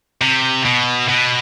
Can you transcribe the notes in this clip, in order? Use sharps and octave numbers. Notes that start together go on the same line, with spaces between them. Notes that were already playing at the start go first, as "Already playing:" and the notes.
C3
B2
B2